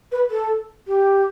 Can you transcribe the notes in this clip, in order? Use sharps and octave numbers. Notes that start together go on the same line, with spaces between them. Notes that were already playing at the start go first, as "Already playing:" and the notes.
B4
A4
G4